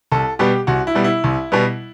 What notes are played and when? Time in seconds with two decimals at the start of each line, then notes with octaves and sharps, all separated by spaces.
0.12 C2 A4
0.39 B2 G3 B3 G4
0.67 C2 F#4
0.87 E4
0.95 B2 G3 B3
1.04 E4
1.24 C2
1.52 B2 G3 B3